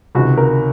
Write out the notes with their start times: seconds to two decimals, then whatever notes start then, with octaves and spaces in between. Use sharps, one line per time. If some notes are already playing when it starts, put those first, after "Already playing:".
0.15 C#2 C3 D#3 F#4
0.37 A#4